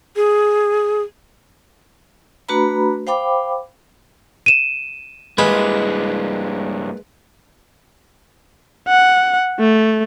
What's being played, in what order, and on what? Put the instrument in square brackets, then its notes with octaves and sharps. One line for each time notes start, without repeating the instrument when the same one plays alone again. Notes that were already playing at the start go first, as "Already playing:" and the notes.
[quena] G#4
[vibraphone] A3 D4 F#4 B4 A#5 B5
C5 F5 G5 B5 D6
[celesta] D#7 E7
[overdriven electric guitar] G2 A#3 [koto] G#3 [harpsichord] B4
[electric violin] F#5
A3